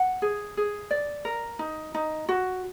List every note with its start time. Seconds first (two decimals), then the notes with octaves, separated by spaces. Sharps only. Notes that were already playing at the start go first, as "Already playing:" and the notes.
Already playing: F#5
0.22 G#4
0.57 G#4
0.91 D5
1.25 A#4
1.59 D#4
1.94 D#4
2.29 F#4